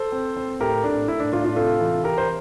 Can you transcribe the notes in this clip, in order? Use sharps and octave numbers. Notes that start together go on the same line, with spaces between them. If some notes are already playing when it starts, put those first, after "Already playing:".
Already playing: A4 C5
C4
C4
A2 G4 A#4
A2 D4
A2 E4
D4
A2 D4 F4
D4 F4
C3 F4 A4
E3
E3 G4 A#4
C5